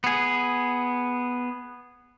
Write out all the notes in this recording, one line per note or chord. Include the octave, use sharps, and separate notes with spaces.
B3 G#4